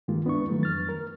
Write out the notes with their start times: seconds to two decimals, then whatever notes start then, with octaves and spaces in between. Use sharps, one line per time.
0.08 G2 D#3 G#3 A#3 F4
0.25 C#2 B3 D4 E4 B4 C#6
0.50 D#3 F#3 A3
0.63 F2 F6 A6
0.89 A#4